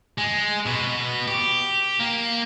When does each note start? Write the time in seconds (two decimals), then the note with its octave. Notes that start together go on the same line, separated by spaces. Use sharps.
0.18 G#3
0.66 B2
1.28 G4
2.00 A#3